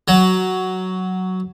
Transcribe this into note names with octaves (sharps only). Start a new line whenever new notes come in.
F#3